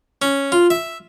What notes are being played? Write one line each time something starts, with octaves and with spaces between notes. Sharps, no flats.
C#4
F4
E5